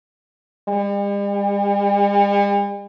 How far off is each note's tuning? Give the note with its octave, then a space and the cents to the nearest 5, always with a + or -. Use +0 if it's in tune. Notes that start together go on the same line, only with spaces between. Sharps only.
G3 +45